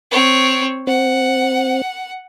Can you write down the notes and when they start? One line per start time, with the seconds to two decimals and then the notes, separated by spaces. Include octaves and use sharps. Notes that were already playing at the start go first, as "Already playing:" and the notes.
0.11 C4 C#5
0.87 C4 F#5